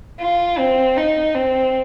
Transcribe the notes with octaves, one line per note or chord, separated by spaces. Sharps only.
F4
C4
D#4
C4